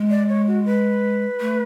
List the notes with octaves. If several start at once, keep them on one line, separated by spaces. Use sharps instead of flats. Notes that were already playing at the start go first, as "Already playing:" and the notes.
Already playing: G#3
D5
C#5
F#4
B4
A3